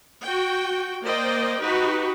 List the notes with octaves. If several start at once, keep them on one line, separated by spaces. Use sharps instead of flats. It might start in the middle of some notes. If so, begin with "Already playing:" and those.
F#4 G5
A#3 C5 D5 D#5 G5
D#4 F#4 G4 B4